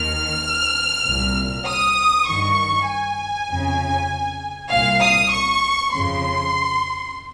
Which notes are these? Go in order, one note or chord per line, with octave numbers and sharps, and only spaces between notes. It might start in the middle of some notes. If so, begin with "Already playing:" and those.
Already playing: D#2 D#3 F6
C2 A#2
D#6
G2 D#3 C#6
G#5
F2 C#3
C2 A#2 F5
D#6
C#6
F2 C#3 C6